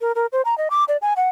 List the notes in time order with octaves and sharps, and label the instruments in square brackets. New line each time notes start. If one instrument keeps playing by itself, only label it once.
[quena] A#4
A#4
C5
A#5
D#5
D6
D5
G#5
F#5